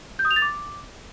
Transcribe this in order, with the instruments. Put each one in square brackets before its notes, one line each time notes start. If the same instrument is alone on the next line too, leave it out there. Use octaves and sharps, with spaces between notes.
[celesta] G6
D#6
F7
A6
D6